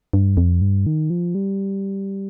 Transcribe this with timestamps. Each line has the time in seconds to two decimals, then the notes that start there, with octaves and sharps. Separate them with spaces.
0.13 G2
0.37 F2
0.61 G2
0.86 D#3
1.10 F3
1.35 G3